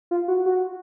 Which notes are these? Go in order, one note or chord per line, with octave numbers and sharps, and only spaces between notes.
F4
F#4
F#4